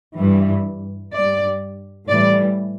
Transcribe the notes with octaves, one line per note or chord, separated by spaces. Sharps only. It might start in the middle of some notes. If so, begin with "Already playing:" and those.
G2 E3 G3
G2 G3 D5
A2 E3 G3 D5